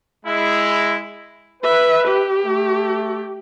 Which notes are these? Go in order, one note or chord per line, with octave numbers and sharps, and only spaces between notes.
G#3 E4
B4 E5
G4
A3